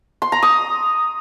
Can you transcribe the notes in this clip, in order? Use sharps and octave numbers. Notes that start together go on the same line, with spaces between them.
C6
A#5
D#6